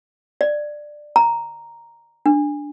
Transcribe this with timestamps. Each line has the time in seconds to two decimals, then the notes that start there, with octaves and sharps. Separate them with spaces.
0.41 D5
1.16 A#5
2.26 D4